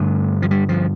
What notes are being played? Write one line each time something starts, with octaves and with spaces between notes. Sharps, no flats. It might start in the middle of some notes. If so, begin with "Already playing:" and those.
Already playing: G2 D3 A3
F3
G3
F3